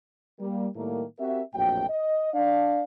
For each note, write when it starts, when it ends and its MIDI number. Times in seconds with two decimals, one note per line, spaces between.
0.40 0.67 55
0.40 0.67 58
0.76 1.03 45
0.76 1.03 51
0.76 1.03 55
0.76 1.03 57
0.76 1.03 58
1.19 1.41 60
1.19 1.41 66
1.19 1.41 67
1.19 1.41 70
1.19 1.41 76
1.54 1.84 34
1.54 1.84 41
1.54 1.84 45
1.54 1.84 54
1.54 1.84 66
1.54 1.84 79
1.89 2.29 75
2.33 2.83 62
2.33 2.83 74
2.33 2.83 77